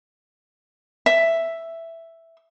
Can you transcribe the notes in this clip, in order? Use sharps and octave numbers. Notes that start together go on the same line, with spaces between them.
E5